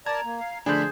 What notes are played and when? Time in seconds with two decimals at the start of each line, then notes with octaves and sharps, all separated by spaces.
0.06 A#4 D5 A5 A#5 G#6
0.25 A#3
0.41 F5
0.66 D3 F3 A3 D4 G#4 C5 B5